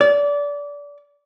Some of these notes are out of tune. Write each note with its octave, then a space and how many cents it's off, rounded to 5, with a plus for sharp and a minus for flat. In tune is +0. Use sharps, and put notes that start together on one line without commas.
D5 -25